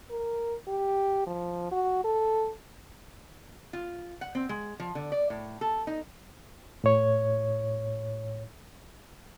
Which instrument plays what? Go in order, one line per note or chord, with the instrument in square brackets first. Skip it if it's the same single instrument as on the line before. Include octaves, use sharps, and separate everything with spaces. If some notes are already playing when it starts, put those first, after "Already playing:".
[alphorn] A#4
G4
F3
F#4
A4
[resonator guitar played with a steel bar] F4
F#5
C4
G#3
F3
D3
D5
A2
A4
D#4
[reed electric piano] A2 C#5